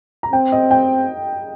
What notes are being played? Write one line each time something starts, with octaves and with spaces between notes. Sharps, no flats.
A#5
C4 G5
D#5
G5